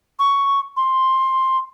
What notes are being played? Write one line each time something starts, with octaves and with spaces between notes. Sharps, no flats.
C#6
C6